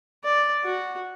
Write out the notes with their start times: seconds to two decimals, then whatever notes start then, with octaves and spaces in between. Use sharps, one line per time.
0.24 D5
0.64 F#4